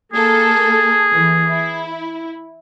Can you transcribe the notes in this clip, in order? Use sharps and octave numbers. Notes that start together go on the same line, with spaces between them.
A#3 G#4 A4
E3
E4